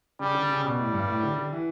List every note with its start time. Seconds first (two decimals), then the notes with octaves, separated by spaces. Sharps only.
0.20 C#3 G3
0.35 D3
0.49 C#3
0.64 B2 G3
0.79 A2
0.94 G2
1.08 A2
1.23 D3
1.38 D3
1.52 E3